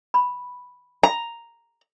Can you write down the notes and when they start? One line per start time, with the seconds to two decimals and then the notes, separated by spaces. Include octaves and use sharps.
0.14 B5
1.03 A#5